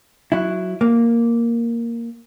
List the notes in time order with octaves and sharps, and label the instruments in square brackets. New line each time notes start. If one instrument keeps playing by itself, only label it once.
[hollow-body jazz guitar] F#3 E4
A#3